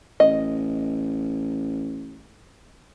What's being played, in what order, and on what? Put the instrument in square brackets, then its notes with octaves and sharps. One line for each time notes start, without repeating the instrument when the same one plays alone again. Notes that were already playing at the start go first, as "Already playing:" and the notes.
[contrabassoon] A1 [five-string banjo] D#5